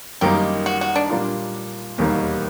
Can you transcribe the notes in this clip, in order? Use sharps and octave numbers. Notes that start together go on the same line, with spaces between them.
F#2 D#3 G3 A#3 D#4 G4
F#4
F#4
D4
A#2 G3 A#3 D4 F4
E1 D#2 D#3 G3 A#3